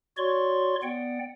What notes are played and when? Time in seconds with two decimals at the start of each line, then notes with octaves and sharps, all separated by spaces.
0.17 F#4 C#5 D5 C6 C#6
0.83 B3 D5 F#5 G5